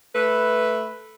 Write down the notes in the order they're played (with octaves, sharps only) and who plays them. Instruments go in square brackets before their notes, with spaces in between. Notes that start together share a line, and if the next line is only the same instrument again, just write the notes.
[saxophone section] A3 B4